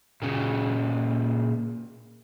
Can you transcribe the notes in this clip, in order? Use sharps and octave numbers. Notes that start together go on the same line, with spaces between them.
A#2 C#3